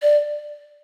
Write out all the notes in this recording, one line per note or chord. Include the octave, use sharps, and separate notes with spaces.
D5